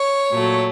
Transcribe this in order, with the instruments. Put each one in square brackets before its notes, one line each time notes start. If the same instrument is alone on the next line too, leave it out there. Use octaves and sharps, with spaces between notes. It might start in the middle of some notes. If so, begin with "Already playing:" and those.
Already playing: [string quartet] C#5
A#2 F#3 A3